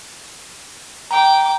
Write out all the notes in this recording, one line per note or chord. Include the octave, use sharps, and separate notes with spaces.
G5 A#5 D6